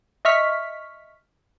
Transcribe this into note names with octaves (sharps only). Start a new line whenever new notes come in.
D#5 E5 C#6 F6 B6